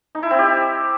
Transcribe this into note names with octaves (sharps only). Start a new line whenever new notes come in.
D#4
E4
C4
G4